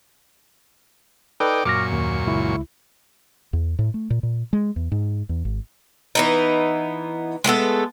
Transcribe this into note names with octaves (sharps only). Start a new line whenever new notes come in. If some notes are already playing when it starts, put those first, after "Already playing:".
D#4 A4 B4 D5 G5
F#2 A#2 C#6 D6 F6 A#6
D#2
C#2 E4
E2
A2
A3
A#2
A#2
G#3
E2
G#2
E2
G#1
E3 B3 D#4
G#3 A3 B3 A4